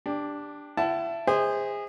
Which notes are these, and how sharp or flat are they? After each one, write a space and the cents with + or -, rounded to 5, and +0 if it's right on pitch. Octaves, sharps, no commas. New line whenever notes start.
D4 +0 G4 +20
E4 +30 F#5 +40 A5 +0
G#4 -25 C5 -5 D#5 +45